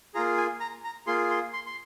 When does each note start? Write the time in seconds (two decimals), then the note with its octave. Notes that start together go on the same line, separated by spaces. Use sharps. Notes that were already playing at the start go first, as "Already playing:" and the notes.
0.14 A#3 F4 G#4 A#5
0.37 G#5
0.60 A#5
0.84 A#5
1.07 A#3 F4 G#4 C6
1.30 C6
1.53 C6
1.66 C6